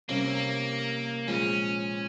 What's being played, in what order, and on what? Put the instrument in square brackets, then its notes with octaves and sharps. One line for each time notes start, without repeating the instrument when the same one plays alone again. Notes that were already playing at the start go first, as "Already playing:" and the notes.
[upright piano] C3 G3 C#4 [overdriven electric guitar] A#3
[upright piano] A#2 F3 G#3 [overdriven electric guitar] C#4